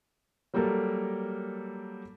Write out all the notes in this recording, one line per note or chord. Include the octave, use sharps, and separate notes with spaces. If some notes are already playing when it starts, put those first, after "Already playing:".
F#3 G3 A#3 A4 A#4